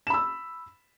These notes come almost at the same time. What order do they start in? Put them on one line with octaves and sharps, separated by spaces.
E7 B5 E6